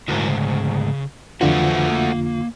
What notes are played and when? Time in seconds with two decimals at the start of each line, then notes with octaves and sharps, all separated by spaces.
0.08 D2 G#2 E4 F#4 A#4
0.28 C#3
1.41 F2 D3 E3 A3 F4 F#4 B4 C5
1.88 A#3